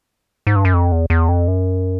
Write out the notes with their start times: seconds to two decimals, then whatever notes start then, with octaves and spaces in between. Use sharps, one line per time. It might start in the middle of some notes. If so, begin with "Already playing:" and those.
0.47 G#2
0.56 G2
0.65 F#2
0.74 F2
0.92 E2
1.10 E2
1.29 F2
1.48 F#2